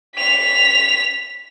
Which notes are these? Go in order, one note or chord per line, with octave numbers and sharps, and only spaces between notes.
B6 F7